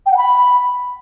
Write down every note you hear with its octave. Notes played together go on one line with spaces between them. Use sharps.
G5
F#5
B5